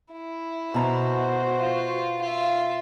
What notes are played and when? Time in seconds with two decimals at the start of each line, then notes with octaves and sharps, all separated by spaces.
0.12 E4
0.74 B2 F#4 C5 A#5
1.60 F4
2.21 F4 E5